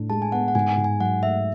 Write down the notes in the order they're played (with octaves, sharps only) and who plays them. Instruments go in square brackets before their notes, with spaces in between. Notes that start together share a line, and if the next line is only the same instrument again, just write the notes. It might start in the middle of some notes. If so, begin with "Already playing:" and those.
Already playing: [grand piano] A2 D4
[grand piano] G#3 [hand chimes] A5
[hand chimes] G#5
[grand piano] B3 [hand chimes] F#5
[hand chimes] F#5
[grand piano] G#2 [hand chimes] G#5
[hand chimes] G#5
[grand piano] G#2
[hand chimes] G#5
[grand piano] F#3 [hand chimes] F#5
[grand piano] A3 [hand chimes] E5